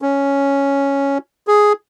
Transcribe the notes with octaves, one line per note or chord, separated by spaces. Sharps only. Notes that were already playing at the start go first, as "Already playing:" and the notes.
C#4
G#4